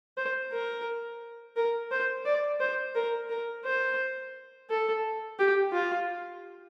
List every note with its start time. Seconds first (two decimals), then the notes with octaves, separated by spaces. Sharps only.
0.17 C5
0.52 A#4
1.56 A#4
1.91 C5
2.25 D5
2.60 C5
2.95 A#4
3.29 A#4
3.65 C5
4.70 A4
5.39 G4
5.73 F4